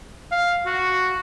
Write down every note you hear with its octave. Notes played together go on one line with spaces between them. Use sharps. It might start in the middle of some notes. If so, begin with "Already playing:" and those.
F5
F#4